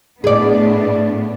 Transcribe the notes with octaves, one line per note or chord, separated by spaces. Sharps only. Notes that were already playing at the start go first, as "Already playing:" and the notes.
A2 B3 D4 G#4 D5